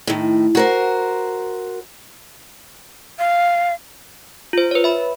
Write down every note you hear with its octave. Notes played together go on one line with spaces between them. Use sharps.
A2 D#3
F#4 A#4 C5
F5
F4 C5
B4 C#5
E5 B5